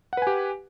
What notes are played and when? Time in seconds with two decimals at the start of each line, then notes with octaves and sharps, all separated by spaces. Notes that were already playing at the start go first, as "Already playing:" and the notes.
0.13 F#5
0.17 B4
0.22 G#5
0.27 G4